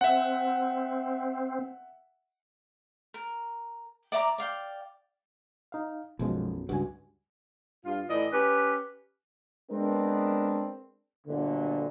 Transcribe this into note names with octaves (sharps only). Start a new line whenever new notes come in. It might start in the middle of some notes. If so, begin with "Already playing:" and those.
C4 E5 F#5
A#4
D5 E5 A#5 D6
D5 F5 G5
D#4 F5
B1 F#2 B2 F3 G#3
C#2 G2 F#4 G#5
G2 F4
A2 E3 D5 D#5
C#4 G4 B4
G#3 B3 C4 D4 A#4
G1 D2 A#2 D3